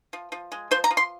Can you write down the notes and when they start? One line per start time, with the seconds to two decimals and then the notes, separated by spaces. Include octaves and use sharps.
0.13 F3
0.32 F3
0.52 G#3
0.71 F3 C5
0.84 A#5
0.91 F3
0.97 C6